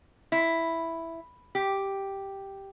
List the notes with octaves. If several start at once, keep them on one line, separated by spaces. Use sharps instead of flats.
E4
G4